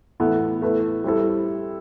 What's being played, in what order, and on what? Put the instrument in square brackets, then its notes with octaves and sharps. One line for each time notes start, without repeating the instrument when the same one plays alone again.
[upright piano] A2 E3 B3 E4 A4
A3 E4 B4
G3 C4 E4 A4